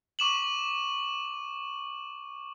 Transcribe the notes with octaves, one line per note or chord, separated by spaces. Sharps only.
C#6 D6 E7 F#7